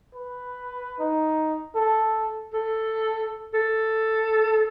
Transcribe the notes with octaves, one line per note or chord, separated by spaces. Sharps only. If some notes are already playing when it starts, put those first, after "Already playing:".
B4
D#4
A4
A4
A4